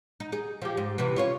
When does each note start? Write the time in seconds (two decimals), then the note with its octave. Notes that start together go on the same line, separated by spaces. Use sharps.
0.20 D#4
0.32 D#4 G#4
0.62 F3 G4
0.77 G#2
0.98 C3 E3
1.16 C#4 F4 C#5